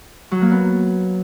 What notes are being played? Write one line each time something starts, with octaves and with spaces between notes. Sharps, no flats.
F#3
A#3
B3